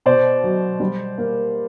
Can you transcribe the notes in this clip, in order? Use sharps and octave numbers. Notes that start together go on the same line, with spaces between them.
B2 C5 D5
F#3
G3
A#3